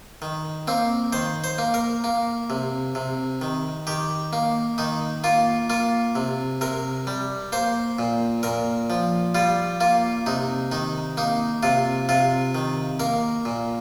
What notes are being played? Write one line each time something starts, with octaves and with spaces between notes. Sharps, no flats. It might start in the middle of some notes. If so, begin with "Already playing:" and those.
D#3
A#3 C4
D#3 C5
C5
A#3
A#4
A#3
C3
C3
D#3
D#3 G4
A#3
D#3 D#4
A#3 F4
A#3 F4
C3
C3 A#4
G3
A#3 C5
A#2
A#2 A#4
F3
G3 F4
A#3 F4
C3 D#4
D#3 D#4
A#3 D#4
C3 F4
C3 F4
D#3
A#3 A#4
A#2